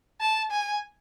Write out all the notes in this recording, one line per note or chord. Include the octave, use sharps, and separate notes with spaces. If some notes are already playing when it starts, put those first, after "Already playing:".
A5
G#5